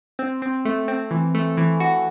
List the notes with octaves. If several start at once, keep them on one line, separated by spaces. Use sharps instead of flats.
C4
C4
A3
C4
E3
A3
E3
F#4